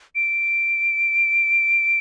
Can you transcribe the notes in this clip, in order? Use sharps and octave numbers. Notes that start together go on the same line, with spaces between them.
D7